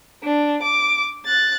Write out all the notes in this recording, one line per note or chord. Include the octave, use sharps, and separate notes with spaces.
D4
D6
F#6 A6